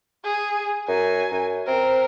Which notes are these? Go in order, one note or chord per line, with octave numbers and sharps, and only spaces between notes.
G#4
F#2 G#5
F#2
C4 A#4